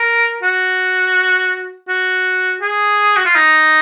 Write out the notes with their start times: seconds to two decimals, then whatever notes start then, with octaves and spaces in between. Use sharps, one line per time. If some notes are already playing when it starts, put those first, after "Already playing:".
Already playing: A#4
0.43 F#4
1.89 F#4
2.61 G#4
3.16 F#4
3.26 F4
3.35 D#4